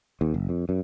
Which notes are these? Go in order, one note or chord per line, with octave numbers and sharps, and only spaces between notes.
D#2
F#1
F2
F#2